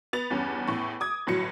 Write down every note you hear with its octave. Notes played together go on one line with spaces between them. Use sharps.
B3 A6 F7
E2 G2 C#4
E2 A2 C#6
D6 D#6 G#6
G1 A2 F#3 C#7